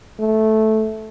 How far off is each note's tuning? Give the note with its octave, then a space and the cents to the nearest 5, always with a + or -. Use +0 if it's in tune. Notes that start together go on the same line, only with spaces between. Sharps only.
A3 -10